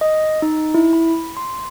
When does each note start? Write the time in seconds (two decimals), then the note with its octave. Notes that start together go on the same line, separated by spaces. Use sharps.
0.01 D#5
0.42 D#4
0.74 E4
0.93 B5
1.37 C6